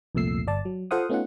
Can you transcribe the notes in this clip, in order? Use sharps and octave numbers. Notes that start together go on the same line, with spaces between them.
C2 F2 A#2 A3 E6 C7
G1 D5 A5
F#3
F4 A4 C5 F5 F#5 D#6
A3 B3 C#4 D#4 F4 F#5